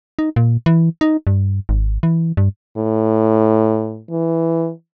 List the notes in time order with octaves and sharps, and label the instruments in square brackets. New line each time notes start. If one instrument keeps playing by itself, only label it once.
[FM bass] D#4
A#2
E3
D#4
G2
G#1
E3
G2
[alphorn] A2
E3